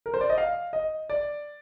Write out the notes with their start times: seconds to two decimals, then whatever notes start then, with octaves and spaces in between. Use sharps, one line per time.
0.06 A#4
0.14 C5
0.21 D5
0.30 D#5
0.38 F5
0.73 D#5
1.10 D5